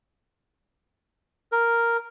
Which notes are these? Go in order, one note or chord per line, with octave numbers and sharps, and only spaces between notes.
A#4